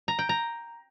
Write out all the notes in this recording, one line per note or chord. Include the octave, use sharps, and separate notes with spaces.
A#5
G5
A#5